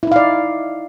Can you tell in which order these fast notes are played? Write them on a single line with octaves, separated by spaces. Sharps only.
E4 D#4 F5 D5